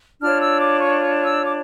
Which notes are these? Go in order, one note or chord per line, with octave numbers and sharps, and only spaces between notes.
D4 F4 C#5 F6
E6
D6
C#6
E6
D6